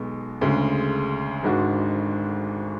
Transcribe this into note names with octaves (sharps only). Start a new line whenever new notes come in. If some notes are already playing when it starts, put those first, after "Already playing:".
Already playing: B1 B2 G#3
D2 C#3 G#3
G#1 G#2 G#3 D4 F#4